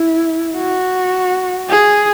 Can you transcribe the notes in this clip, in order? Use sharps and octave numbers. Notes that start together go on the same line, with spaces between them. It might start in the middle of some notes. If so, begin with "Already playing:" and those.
Already playing: E4
F#4
G#4